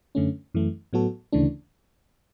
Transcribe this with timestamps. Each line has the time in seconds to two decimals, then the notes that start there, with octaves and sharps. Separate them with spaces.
0.15 F#2 D3 A3 C#4
0.54 F#2 E3 A3
0.93 A2 F#3 B3 F#4 A4
1.32 D2 C#3 E3 A3 D4